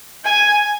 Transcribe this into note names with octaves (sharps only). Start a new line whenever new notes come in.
G#5